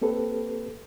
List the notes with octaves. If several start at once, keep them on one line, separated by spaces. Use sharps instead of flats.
A#3 C4 G4 A4 B4